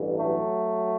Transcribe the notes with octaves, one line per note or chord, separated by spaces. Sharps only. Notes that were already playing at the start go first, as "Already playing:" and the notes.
Already playing: A1 G2 E3
F#3 A3